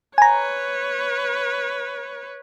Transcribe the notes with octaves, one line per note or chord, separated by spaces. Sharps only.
B4 C#5 G#5 A#5